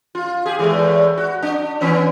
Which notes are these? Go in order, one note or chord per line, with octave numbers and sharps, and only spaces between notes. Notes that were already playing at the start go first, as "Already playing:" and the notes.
F4
G4 G#4
E2 A2 G#3
F#4
D4
E3 B3 C#4